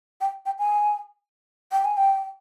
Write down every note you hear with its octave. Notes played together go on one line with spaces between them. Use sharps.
G5
G5
G#5
G5
G#5
G5